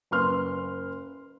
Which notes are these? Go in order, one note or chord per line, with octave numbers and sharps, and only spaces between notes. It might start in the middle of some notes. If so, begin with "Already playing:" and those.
F#1 B4 C6 F6